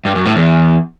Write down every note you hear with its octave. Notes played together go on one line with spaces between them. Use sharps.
G2
F#2
A2
E2